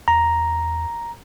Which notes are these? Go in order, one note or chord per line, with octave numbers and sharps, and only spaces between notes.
E2 A#5